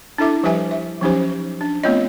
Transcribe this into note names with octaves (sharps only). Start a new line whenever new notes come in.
D4 E4 A4 E5 D6
F3 G3 G4 B4 E5 G#5
E5
F3 F#3 C#4 D#4 G4 C5
D4
A3 B3 C4 F4 C#5 D#5